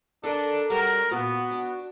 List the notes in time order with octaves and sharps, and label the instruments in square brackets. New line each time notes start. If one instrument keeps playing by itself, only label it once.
[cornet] D4 [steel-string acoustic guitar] A4 A#4 D#5
[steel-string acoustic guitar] G3 C#4 F#4 [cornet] A#4
[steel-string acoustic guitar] A#2 [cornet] B3 [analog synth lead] F#4
[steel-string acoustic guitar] D4